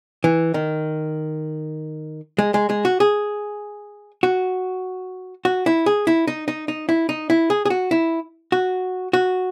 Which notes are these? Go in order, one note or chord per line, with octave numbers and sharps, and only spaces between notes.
E3
D#3
G#3
G#3
G#3
F#4
G#4
F#4
F#4
E4
G#4
E4
D#4
D#4
D#4
E4
D#4
E4
G#4
G#4
F#4
E4
F#4
F#4